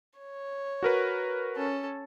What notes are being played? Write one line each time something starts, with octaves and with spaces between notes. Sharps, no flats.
C#5
F#4 A#4 B4
C#4 A4